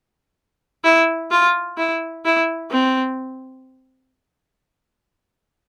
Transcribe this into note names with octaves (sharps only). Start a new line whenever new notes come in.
E4
F4
E4
E4
C4